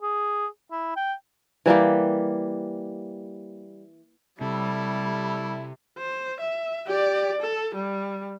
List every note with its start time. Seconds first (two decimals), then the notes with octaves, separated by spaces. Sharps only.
0.02 G#4
0.71 E4
0.96 G5
1.66 E3 G3 A#3 G4
4.41 C3 G3 E4 A4
5.98 C5
6.40 E5
6.87 G4 D5
7.42 A4
7.75 G3